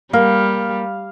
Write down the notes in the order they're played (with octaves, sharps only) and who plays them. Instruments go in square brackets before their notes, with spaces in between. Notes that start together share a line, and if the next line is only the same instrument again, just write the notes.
[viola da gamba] G3 [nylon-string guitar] A#3 [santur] F5